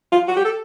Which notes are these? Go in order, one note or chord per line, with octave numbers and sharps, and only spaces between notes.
F4
F#4
G4
A4